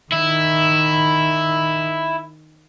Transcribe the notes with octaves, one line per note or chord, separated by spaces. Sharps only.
D#3 E4